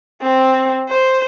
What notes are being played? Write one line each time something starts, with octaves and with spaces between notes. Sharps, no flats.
C4
C5